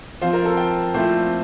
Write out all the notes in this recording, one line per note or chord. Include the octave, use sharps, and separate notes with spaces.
F3 C4 F4 C5
A#4
A4
G5
A#2 F3 A3 C4 E4 C5